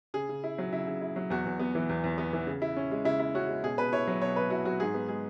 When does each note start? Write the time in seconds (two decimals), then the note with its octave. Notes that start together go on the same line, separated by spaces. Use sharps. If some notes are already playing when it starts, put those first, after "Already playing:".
0.14 C#3 G#4
0.29 C#3
0.44 E4
0.58 F#3
0.73 C#3 E4
0.87 C#3
1.01 E4
1.16 F#3
1.30 E2 F#4
1.45 E2
1.59 B3
1.75 E3
1.89 E2
2.04 E2
2.18 B3
2.33 E3
2.47 C#3
2.62 E4
2.76 C#4
2.91 G#3
3.05 C#3 E4
3.20 E4
3.34 C#4 F#4
3.49 G#3
3.63 B2 G#4
3.78 B2 B4
3.93 E4 C#5
4.08 F#3
4.22 B2 C#5
4.36 B2 B4
4.50 E4 F#4
4.65 F#3 F#4
4.80 G#2 G#4
4.94 B3
5.09 G#3 G#4